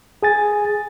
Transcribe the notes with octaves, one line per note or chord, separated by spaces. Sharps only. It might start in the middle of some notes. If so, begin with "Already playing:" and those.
G#4 G#5 A6